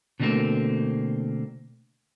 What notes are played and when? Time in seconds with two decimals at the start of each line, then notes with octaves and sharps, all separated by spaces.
0.20 B2 D3 G3 A3 A#3 C4